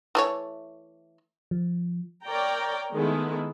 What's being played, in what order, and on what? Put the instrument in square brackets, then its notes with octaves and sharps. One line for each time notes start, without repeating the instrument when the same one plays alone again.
[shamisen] E3 A3 C#5
[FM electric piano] F3
[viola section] A#4 C#5 D5 G5 A#5
D#3 G#3 A3 B3 E4